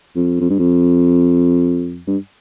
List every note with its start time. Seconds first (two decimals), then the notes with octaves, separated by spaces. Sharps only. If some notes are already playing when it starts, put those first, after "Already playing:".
0.16 F2
0.41 F2
0.50 G2
0.59 F2
2.07 G2